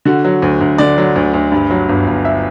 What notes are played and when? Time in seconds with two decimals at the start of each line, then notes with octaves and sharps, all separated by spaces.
0.05 D3 F#4
0.24 F#3
0.42 D2
0.61 D2
0.78 D3 D5
0.98 F#3
1.16 D2
1.34 D2
1.52 G2
1.70 F#3
1.89 G1
2.07 G1
2.25 E5